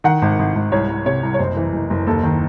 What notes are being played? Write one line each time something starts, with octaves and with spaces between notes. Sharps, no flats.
D#3 F#5
G#1
G#1
G#1
C2 C#5
C2
C3 C#5
C2
C#5
F#1 C5
E3
F#1
F#1
D#2 A4
D#3